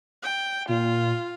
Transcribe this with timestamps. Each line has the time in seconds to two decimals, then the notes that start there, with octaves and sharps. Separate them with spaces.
0.23 G5
0.69 A#2 F4